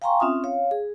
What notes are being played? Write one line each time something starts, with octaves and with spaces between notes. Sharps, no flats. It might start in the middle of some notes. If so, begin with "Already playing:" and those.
F5 G5 G#5 A#5 C6 C#6
C4 C#4 F4 E5 D#6
C#5 F5
G#4